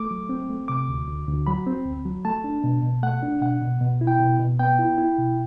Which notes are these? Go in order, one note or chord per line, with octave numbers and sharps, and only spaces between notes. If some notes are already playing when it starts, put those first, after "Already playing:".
Already playing: A3 D6
F#3
C4
A3
C3 D6
D2
D2
D2
F#3 B5
C4
D2
F#3
A3 A5
D4
B2
B2
A3 F#5
D4
B2 F#5
B2
B2
E4
G5
B2
B2
B3 G5
E4
E4
B2